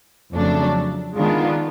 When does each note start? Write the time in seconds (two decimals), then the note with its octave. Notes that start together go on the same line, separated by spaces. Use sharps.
0.34 F2 C#3 F#3 A3 D4
1.17 D#3 G#3 B3 D4 F4